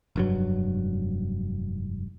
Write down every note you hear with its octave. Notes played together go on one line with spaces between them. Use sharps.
F1 G2 F#3